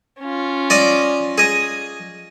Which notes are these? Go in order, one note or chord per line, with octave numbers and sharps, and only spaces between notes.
C#4 F4
D5 D#5 D6
G#4 D#5